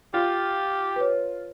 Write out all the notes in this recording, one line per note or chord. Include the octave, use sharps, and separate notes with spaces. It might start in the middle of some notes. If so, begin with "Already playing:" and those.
F4 G4
B4 C#5